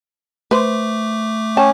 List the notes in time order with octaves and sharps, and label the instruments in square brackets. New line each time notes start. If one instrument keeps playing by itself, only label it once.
[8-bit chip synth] A3 D6 [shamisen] B4 C5
[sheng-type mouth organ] C#4 [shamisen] G5 A5